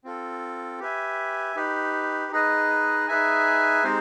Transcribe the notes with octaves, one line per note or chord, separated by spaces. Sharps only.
C4 F4 A4
G4 B4 E5 G#5
D#4 G4 B4
D#4 G#4 B4 D#5
D#4 G#4 B4 E5 G#5
G#3 C4 D#4 G4 C5